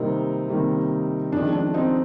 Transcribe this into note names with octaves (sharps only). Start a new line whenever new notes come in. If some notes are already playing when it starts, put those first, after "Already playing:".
Already playing: C3 D#3 G3 A#3 C4 D#4
C3 D#3 G3 A#3
F2 D#3 G#3 D4
D4
C4 D#4